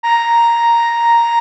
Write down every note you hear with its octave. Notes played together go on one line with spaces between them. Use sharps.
A#5